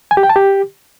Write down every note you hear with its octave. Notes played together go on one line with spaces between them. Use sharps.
G#5
G4
G5
A5
G4